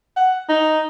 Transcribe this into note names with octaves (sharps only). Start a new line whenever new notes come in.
F#5
D#4